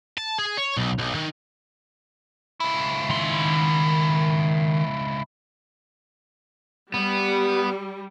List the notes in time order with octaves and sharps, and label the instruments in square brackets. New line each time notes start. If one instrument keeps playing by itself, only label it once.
[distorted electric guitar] A5
G#4
C#5
B1
B1
D#3
[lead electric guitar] C#2 E4
[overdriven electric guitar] D#3 C6
[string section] G3 [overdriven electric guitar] B3